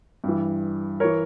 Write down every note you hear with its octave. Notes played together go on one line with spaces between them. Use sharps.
G2 E3
E3 A#4 C#5